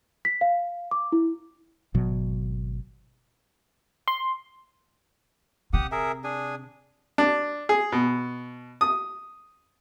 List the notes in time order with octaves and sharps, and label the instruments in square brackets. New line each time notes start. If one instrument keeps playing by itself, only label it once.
[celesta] B6
F5
D6
E4
[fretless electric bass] G#1 B2 F#3
[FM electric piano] C6
[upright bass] C3 [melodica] G4 F#5 D#6
[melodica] G#4 A#4 E5
D4 G#4 G#5
[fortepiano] D4
G#4
B2
D#6